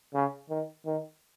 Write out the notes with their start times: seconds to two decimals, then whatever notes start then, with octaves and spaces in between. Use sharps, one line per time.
0.14 C#3
0.50 D#3
0.86 D#3